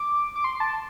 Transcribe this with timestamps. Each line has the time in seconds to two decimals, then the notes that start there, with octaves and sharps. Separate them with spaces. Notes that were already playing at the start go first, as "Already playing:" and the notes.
Already playing: D6
0.36 D6
0.44 C6
0.60 A5